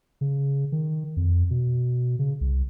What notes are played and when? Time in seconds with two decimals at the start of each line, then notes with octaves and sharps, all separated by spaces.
0.21 C#3
0.72 D#3
1.17 F2
1.50 B2
2.19 C#3
2.41 C2